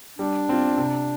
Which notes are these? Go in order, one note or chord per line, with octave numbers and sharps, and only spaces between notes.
G3 D4
C4 F4
C3